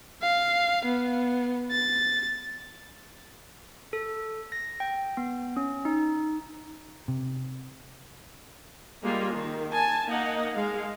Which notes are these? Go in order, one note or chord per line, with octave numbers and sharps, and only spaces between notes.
F5
B3
A6
A4
A#6
G5
B3
C#4
D#4
C3
G3 G#3 A#3 F4
D#3
G#5 A5
A#3 D#4 D#5 F#5
G#3 F5